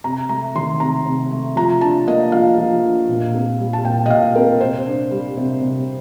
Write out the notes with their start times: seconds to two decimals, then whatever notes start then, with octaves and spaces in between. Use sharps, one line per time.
0.04 C3 A#5
0.29 A3 A#5
0.55 D#3 C6
0.80 C3 A#5
1.06 C3
1.31 A3
1.56 F3 A#5
1.81 D4 A5
2.07 A#3 D#5
2.32 F3 F5
2.58 F3
2.83 D4
3.08 A#2
3.34 C4
3.59 G3
3.73 A5
3.85 A#2 G5
4.06 D#5
4.10 A#2 F5
4.35 C4 A#4
4.61 C3 C5
4.86 D4
5.11 G3
5.37 C3
5.62 C3